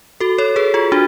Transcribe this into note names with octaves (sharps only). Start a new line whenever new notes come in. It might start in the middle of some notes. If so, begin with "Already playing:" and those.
F#4 A4
A4 C#5
G#4 B4
F4 G#4
D4 F#4